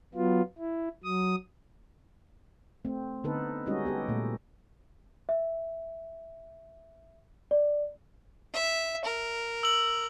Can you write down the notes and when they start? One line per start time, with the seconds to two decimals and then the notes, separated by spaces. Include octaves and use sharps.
0.15 F#3 B3 F4
0.59 E4
1.04 F#3 D#6
2.85 A3 C4
3.24 D3 B3 D#4 A4 B4
3.66 G3 G#3 C#4 D#4 F#4 D#5
3.85 B3 G4 A4
4.08 A#2 A3
5.29 E5
7.51 D5
8.54 E5
9.05 A#4
9.63 E6 F#7